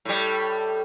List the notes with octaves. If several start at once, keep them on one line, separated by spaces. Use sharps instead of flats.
A2 G3